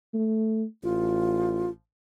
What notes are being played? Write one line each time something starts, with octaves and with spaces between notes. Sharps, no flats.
A3
A1 F4